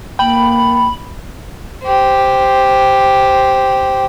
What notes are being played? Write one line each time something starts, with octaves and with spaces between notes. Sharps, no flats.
A#3 G5 B5
G4 C5